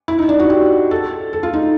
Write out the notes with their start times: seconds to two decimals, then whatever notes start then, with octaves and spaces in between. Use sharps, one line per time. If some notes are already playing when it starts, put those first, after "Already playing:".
0.08 E4
0.19 D#4
0.29 D4
0.40 F#4
0.50 G4
0.91 A4
1.33 A4
1.43 F4
1.53 D#4